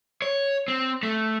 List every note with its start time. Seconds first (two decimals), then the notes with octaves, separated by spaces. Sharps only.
0.22 C#5
0.68 C4
1.03 A3